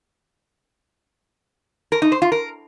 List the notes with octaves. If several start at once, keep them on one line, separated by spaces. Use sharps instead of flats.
A#4
D#4
C5
F4
A#4